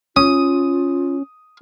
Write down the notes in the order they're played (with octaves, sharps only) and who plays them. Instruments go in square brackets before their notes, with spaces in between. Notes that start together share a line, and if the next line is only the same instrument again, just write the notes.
[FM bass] C#4 [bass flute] F4 [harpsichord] D#6